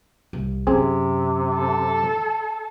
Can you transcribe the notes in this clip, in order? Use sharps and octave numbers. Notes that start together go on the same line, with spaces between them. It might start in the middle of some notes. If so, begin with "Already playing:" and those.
C2
F#2 C3 C4 G#4
A4